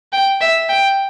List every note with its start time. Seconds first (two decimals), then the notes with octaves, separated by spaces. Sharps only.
0.13 G5
0.41 E5
0.69 G5